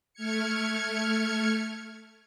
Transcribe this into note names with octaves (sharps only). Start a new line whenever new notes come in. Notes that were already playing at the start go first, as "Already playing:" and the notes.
A3 F6 G#6 C#7